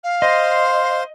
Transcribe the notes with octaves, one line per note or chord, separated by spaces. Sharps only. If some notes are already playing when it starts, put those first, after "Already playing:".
F5
C5 D#5 C6